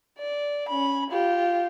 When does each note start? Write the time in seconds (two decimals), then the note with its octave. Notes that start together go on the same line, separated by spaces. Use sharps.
0.18 D5
0.68 C#4 B5
1.10 F4 G4